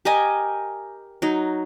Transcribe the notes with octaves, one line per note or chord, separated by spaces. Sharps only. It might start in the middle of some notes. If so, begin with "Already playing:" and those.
G4 A#4 D#5 G#5
F#3 D#4